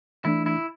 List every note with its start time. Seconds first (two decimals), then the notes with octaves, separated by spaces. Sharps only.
0.25 E3 A3 D4 E4
0.46 E4